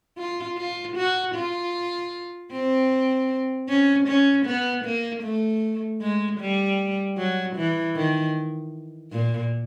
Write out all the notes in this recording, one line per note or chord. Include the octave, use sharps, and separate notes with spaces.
F4
F4
F#4
F4
C4
C#4
C#4
B3
A#3
A3
G#3
G3
F#3
E3
D#3
A#2